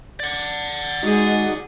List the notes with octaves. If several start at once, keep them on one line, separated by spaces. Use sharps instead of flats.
D5 F#5
G#3 D#4 F#4 G#4